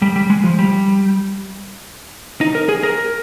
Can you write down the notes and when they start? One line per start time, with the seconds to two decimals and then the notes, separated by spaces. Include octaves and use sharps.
0.02 G3
0.16 G3
0.30 G#3
0.44 F3
0.59 G3
2.41 D#4
2.55 A#4
2.69 G#4
2.83 A#4